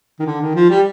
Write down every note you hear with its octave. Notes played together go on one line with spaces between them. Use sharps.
D#3
D3
D#3
F3
G3